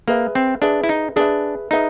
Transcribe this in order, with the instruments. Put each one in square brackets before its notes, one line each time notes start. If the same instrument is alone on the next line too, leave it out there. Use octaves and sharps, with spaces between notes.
[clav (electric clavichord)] A#3 [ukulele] G#4 B4 E5
[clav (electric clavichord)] C4
[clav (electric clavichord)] D4 [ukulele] G#4 B4 E5
[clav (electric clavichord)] E4
D#4
[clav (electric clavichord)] D4 [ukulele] G#4 B4 E5
[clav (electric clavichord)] D#4 [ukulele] G#4 B4 E5